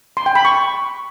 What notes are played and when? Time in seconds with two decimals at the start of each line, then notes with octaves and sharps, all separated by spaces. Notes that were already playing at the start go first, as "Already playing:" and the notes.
0.17 C6
0.26 G5
0.35 B5
0.45 C#6